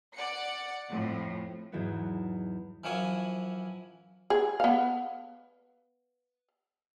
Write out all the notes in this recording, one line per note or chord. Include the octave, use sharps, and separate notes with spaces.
D5 F#5 C#7
F2 A2
E2 G#2 E3 F#3 G#3 B3
F#2 E3 F3 C#5 F#5 G#5
G#4
B3 F5